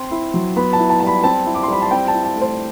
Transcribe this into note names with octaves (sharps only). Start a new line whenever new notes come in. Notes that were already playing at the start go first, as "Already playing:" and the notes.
Already playing: C4 C6
E4
F#3
B3 B5
A5
E4
A5
G3 A5
B5
C4 A5
E4
D6
C6
G3 B5
A5
C4 G5
A5
E4
A5
A3
C5